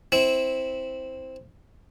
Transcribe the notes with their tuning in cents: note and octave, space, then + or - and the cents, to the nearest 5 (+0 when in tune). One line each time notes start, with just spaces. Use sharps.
C4 +0 E4 -20